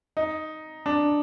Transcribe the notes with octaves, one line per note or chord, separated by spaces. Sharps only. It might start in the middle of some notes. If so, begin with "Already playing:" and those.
D#4
D4